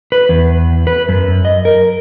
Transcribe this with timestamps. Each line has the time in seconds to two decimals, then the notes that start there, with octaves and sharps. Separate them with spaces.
0.12 B4
0.29 E2
0.87 B4
1.09 F#2
1.45 D#5
1.65 A#4